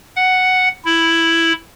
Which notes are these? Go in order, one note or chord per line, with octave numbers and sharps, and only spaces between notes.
F#5
E4